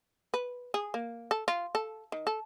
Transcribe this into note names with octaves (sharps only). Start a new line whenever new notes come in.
B4
G#4
A#3
A4
F4
A4
D#3
A4